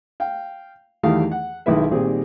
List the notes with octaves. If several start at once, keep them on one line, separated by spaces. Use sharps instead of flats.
F5 G5
E2 D#3 G3 A3 E4 F5
F#5
B1 D#3 G#3 E4 B4 E5
A#2 D#3 G3 C4 G#4